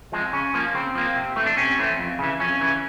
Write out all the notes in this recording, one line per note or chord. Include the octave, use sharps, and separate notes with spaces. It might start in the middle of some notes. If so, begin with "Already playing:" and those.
F3 G#3 C4
C#3 C#4
F3 A#3
C#3 C4
F3 A#3
C3
E3 A3 C4
D4
C3 C#4
E3 A3 C4
F2
C#3 E3
F2 C#4
C#3 E3